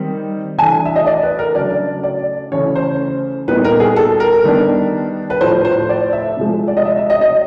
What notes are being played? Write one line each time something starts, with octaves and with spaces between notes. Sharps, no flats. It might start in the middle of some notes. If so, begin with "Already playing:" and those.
Already playing: D#3 G3 C4 D#4
E3 A3 D4 G#5
E5
D#5
D5
B4
A#4
C#3 F#3 A3 D4 D5
D5
C#3 E3 A3 C#4 C#5
C5
A#2 G3 B3 D#4 B4
A#4
G#4
A4
A#4
D#3 G3 B3 D4
B4
A2 F3 A3 C5
C5
D5
E5
C3 F3 G#3
D5
D#5
E5
E5
D#5
D#5